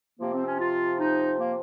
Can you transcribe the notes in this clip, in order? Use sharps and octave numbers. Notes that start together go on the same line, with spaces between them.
C3 F3 A#3
C4
C#4
F4
D#4
A#3